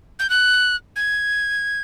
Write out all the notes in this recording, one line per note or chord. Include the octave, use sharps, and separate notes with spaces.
G6
F#6
G#6